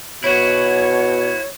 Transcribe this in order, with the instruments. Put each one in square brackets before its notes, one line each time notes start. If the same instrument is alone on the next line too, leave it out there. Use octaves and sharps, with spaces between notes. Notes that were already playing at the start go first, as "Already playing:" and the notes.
[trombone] B2 [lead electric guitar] E4 F#4 [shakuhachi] C#5